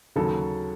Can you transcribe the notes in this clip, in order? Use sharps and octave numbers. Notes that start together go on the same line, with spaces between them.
D#2 C#3 F#3 A4